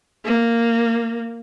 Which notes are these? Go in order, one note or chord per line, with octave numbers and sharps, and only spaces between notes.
A#3